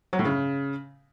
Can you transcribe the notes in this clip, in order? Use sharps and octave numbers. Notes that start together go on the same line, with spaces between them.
F#3
A2
C#3